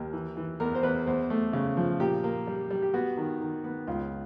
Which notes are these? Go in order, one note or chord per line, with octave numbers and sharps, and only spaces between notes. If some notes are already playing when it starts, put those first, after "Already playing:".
Already playing: D#2 A#4
E3
E3
E2 A#4
C5
E2 B4
E2 C5
A3
C#3
F3
A#2 G4
A#3
G3
G3
G4
B3 F#4
D#3
D#3
B3
C#2 F4